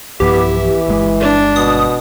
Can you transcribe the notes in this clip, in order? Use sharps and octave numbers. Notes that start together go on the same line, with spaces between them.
B1 G2 F3 B3 E4 G4
E3
G1 G#3
D4
B2 D#6